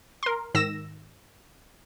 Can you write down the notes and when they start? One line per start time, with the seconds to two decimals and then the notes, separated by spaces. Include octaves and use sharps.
0.23 A#4 C6
0.55 G#2 D#3 E6 A#6 E7